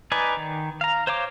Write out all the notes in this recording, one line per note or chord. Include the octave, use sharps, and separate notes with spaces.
D#4 B4 D5 G#5
D#3
F5 A#5
C5 C#5 F5 D6